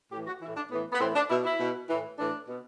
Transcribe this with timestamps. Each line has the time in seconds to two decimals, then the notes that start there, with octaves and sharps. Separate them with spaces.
0.12 A2 G4
0.15 E3
0.27 F#4
0.41 A2 E3 E4
0.56 D4
0.71 A2 E3 B3
0.93 B3
1.00 A2 E3 C4
1.15 D4
1.30 B2 E4
1.45 E4
1.60 B2
1.89 A2 E3
2.19 A2 E3 D4
2.48 B2